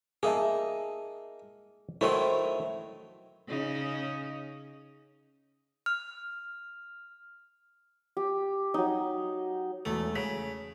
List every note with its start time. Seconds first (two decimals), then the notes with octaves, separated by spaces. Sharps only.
0.23 A#3 D#4 G#4 E5 A5
2.01 D#3 F#3 A3 E4 C5
3.48 C#3 C#4 D#4
5.86 F6
8.17 G4
8.74 F#3 D#4
9.85 E1 E2 A3
10.15 C#3 B6